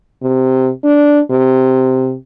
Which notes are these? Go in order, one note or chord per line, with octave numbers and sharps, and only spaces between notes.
C3
D4
C3